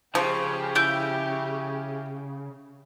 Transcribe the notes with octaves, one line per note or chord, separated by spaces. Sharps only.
C#3 F3 G4
E4 G6